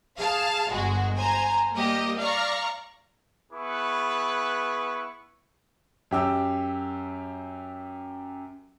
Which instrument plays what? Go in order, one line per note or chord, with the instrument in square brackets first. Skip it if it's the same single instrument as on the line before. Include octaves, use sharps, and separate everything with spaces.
[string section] G#4 F5 A5
G1 G#3 F#4
C5 G#5 A#5
G3 A#3 G4 D#5
D5 F5 A#5 C#6
[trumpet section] B3 E4 G#4 B4 C#6
[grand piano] F#2 G4 E6